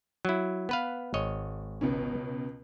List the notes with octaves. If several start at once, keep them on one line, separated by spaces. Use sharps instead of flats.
F#3 E4
B3 B4 F5
G#1 C#5 D#5
C#2 B2 C#4